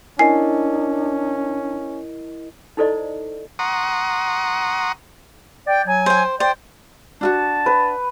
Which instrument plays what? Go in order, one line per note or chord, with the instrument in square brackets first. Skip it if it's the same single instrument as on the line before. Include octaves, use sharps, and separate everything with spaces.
[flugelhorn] C#4 [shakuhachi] D4 [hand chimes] E4 A#4 D#5 [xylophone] G#5 C7
[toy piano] D#4 E4 A4 C5 D5 D#5
[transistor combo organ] F#5 A#5 C6 C#6 D#6
[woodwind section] D5 G5
F#3 G#5
[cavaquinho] C5 G5
[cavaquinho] C5 [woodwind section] D5 G5
[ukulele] D4 F4 F#4 [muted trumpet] A5
[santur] B4